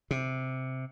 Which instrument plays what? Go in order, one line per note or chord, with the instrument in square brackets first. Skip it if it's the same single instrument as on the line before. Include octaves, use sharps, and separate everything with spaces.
[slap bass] C3